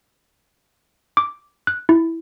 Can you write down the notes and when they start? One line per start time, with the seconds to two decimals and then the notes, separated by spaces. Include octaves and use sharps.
1.17 D6
1.67 F#6
1.89 E4